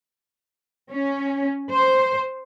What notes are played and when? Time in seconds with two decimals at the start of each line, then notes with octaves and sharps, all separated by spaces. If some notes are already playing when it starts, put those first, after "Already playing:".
0.91 C#4
1.70 C5